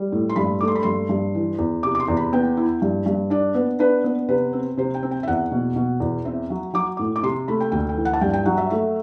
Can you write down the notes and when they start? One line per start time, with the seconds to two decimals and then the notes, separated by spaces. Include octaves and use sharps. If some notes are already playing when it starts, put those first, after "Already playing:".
Already playing: G3
0.12 A2
0.30 C6
0.36 G2 B5
0.61 A3 D6
0.68 C6
0.75 B5
0.83 G2 C6
1.09 G2
1.35 E3
1.58 E2
1.83 C3 D6
1.95 D6
2.00 C6
2.08 E2
2.17 B5
2.33 B3 G5
2.57 E4
2.82 G2
3.06 G2
3.30 D4 D5
3.55 B3
3.79 D4 B4
4.04 B3
4.28 C3 B4
4.53 C4
4.77 C3 C5
4.94 G5
5.03 C4
5.11 G5
5.23 E5
5.27 E2 F#5
5.52 B2
5.76 B2
6.00 E2
6.25 C4 E5
6.50 F#3
6.74 F#3 D6
6.97 A2 D6
7.16 D6
7.23 C3 C6
7.48 A3 B5
7.60 G5
7.72 D2 G5
7.89 G5
7.97 E3
8.05 F#5
8.13 A5
8.21 G2 G5
8.33 G5
8.45 F#3 F#5
8.58 E5
8.70 A3 E5